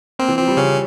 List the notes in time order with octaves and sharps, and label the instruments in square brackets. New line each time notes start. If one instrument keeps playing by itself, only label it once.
[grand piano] A#3 [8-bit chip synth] C4
[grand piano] E3
[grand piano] F3 [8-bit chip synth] C4
[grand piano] G3
[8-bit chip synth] C#3 C#4